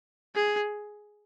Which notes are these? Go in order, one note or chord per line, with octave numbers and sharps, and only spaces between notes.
G#4